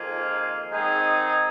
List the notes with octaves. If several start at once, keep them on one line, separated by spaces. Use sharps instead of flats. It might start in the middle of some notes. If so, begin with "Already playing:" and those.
Already playing: F2 D#3 A#3 F4 G#4
D#3 G#3 C4 D#4 G#4